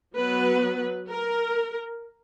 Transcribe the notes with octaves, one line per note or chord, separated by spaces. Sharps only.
F#3 B3 B4
A#4